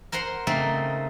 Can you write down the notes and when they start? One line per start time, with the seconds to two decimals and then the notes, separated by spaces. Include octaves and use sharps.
0.12 A#4 C5 F#5 A#5 C6
0.47 C#3 A3 A#3 C4 D#4